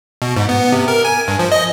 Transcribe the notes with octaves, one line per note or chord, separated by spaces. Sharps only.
B2
G#2
B3
C3
A#4
G#5
G2
F3
D#5